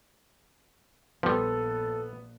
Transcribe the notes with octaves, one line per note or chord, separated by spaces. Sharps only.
A#1 F3 G3 B3 A4